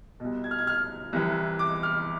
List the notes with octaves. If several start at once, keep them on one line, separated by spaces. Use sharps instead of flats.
C2 B2
G#6
F6
G#6
F6
C2 C3 E3
D6
F6